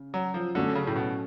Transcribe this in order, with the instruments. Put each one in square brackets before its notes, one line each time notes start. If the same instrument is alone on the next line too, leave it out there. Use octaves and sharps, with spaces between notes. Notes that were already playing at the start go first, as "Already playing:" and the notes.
Already playing: [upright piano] C#3
[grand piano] F#3
F3
[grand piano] D3 [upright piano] F#3 A3 C#4
[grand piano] C#3
A2
B2